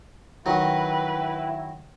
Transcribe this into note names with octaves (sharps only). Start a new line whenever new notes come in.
D#3 F#3 E4 B4 G5